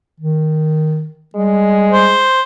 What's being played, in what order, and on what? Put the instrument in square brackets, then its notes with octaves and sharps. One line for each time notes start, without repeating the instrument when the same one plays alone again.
[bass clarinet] D#3
[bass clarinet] G3 [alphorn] G#3
[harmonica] C5